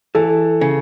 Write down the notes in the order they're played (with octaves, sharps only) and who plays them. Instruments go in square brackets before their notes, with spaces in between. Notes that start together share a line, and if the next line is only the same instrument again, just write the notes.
[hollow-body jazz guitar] E3 [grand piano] A4
[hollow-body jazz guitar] C#3